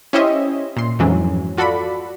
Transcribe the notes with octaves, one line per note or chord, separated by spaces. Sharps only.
C#4 E4 G4 C5 D#5 E5
A#2 C6
F2 G#2 E3 F#3 C#4
F4 F#4 A4 D5 B5